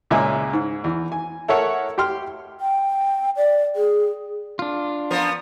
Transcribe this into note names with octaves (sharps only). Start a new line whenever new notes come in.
C#2 A#2 G#3 E5 G#5
G#2
E2
G#5
E4 A4 A#4 C#5 E5 F#5
G4 G5 C6 F6
G5
D5
G#4
D4 F4
F3 B3 A#4